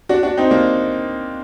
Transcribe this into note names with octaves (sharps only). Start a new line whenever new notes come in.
D4 F#4
D4 F#4
C4 D#4
A#3 D4